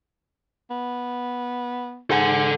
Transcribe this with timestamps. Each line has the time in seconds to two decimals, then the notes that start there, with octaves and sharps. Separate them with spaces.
0.70 B3
2.10 G#2 A4 F#5